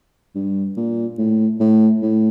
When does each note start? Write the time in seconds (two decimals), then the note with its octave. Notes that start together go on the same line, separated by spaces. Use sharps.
0.35 G2
0.76 A#2
1.18 A2
1.60 A2
2.02 A2